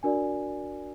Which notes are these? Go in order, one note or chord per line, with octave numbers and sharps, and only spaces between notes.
D4 F#4 A#4 D5 G#5